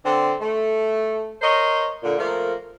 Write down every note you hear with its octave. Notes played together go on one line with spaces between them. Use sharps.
D3 C4
A3
A#4 C5 C#5 D#5
A#2 D3
F3 A3 A#3